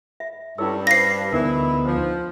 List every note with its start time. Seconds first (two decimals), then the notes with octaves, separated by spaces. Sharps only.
0.20 E5
0.58 G2 C#4 E4 A4 C#5 E6
0.87 B4 C5 F5 A#6 C7
1.32 D2 E3 B3 D#4 E4 A#4
1.85 F3 C5